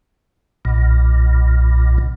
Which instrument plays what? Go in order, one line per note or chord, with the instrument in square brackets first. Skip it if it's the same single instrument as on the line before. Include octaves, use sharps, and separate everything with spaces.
[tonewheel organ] B1 A#2